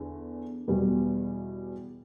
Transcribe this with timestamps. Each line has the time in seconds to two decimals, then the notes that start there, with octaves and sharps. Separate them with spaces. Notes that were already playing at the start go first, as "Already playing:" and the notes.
Already playing: E2 D3
0.68 E2 B2 G3